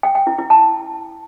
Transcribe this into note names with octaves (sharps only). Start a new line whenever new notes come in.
G5
G5
E4
E4
A5